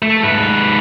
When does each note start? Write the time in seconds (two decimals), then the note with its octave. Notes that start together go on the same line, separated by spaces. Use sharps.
0.03 A3
0.24 G#2 B4